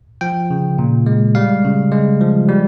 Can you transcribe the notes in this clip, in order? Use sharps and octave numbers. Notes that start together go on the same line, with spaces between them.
F3 G5
C#3
A#2
G#3
G3 F5
C#3
G#3
F3
G3